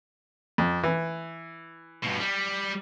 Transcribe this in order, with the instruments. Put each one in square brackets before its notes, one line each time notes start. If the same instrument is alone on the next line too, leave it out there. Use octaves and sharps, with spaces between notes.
[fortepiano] F2
E3
[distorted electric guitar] G2 B2
G3